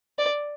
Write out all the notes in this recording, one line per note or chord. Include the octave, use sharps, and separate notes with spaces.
D5